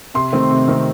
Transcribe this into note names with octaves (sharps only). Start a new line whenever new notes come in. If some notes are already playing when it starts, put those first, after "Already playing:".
C3 C6
D#3 A3 C4
C3
D#3 A3 C4